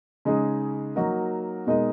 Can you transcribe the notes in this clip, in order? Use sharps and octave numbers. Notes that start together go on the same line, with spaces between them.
C#3 G#3 D#4 G#4
F#3 A#3 D#4 F#4 A#4
B2 G#3 D#4 A#4 D#5